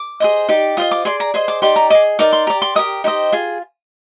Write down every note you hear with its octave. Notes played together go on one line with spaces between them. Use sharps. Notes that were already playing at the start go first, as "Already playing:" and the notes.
Already playing: D6
G#4 C5 D#5
D#4 G4 D5
F4 C5 D#5 D#6
D6
G#4 D5 C6
A#5
G#4 C5 D#5
D6
D#4 G4 D5 C6
A#5
G#4 D#5 D6
D#4 A#4 D5 D6
C6
G4 D5 A#5
C6
G4 A#4 D#5 D#6
D#4 G4 C5 D#5
F4 G#4